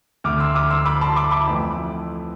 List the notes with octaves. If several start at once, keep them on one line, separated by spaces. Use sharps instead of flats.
D2 D3 A3 D6 F6
C6 E6
D6 F6
C6 E6
B5 D6
A5 C6
B5 D6
B5 D6
F2 E3 A3